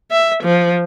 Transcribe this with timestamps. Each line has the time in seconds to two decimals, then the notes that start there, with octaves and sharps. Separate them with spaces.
0.11 E5
0.42 F3